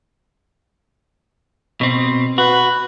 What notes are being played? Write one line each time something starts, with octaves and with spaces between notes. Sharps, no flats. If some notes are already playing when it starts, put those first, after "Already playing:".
B2 C4
F#4 B4